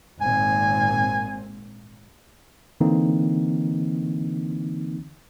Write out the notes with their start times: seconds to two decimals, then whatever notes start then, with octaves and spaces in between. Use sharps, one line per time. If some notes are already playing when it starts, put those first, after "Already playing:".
0.21 G#1 A#2 C4 G#5
2.81 D3 E3 A#3 C4 D#4